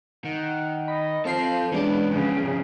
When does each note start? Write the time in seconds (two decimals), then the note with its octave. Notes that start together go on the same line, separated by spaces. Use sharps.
0.25 D#3 F#5
0.88 D#5 B5
1.25 F3 C4 A4 C5 F5 C7
1.72 E3 G#3 B3 C#4 D4 D5
2.11 E2 C#3 F3